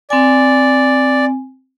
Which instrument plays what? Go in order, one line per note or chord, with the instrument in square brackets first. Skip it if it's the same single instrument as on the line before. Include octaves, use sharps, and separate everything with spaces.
[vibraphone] C4 G#5 [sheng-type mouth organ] D5